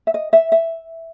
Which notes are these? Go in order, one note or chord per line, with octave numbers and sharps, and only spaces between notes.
E5
D#5
E5
E5